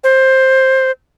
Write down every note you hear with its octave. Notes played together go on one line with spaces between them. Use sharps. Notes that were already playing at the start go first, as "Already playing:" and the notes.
C5